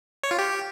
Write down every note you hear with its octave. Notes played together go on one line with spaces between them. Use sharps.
C#5
F4
G4